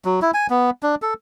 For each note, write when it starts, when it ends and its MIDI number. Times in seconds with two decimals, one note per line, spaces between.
0.05 0.20 54
0.22 0.31 64
0.34 0.47 80
0.50 0.70 59
0.83 0.95 62
1.02 1.14 69